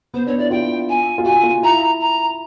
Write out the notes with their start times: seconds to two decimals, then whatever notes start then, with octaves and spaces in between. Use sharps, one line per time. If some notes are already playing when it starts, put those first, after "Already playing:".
0.14 B3 C5
0.26 D4 C#5
0.38 E4 D5
0.51 F4 G5
0.89 G#5
1.18 F4
1.25 F#4 G#5
1.44 F4
1.63 E4 A#5
2.00 A#5